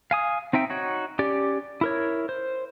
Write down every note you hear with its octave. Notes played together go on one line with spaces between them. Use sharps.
F5 G#5 D#6
C4 D#4 E5 G5
D#4 F#4 C#5
C#4 G4 D5
E4 A#4 C#5
C5